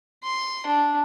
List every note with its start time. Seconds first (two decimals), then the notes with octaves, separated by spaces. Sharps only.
0.23 C6
0.66 D4